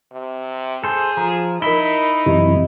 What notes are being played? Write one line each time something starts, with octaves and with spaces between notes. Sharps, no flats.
C3
G#4 A4 C5
F3 A#5
D#4 E4 A#4 B5 G7
F#2 C3 E3 G4 D#5